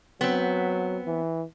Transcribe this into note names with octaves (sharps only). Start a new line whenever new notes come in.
F#3 B3 C4
E3